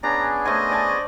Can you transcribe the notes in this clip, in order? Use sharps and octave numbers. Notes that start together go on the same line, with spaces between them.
B3 C#4 D4 G#4 A#5
A3 C5 D#5 G#5
D5 G#5 A5